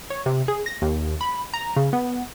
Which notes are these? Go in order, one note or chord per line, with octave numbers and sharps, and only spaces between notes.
C#5
C3
G#4
A#6
D#2
B5
A#5
C#3
B3